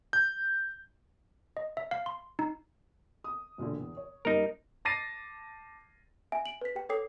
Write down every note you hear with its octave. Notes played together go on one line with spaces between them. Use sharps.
G6
D#5
E5
F5
C6
D#4
D#6
E1 A#2 D3
E2
C#5
F#2 G3 A#3 D#4 A#4
A5 D6 A6 A#6 C7 D#7
E5 F#5 G#5
D7 F#7
B4 B6
G4 G5
A4 C#5 G5 D6 D#6 C7